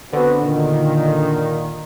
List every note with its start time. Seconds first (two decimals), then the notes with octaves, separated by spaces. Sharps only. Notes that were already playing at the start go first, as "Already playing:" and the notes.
0.13 D3 B3 C4 F#4
0.43 A#2 D#3